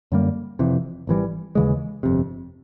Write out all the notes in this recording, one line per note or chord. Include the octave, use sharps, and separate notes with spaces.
F#2 D3 G3 A#3
F1 F2 C3 E3
G#1 G#2 E3 G3
D#2 C#3 E3 G#3
G1 F2 C3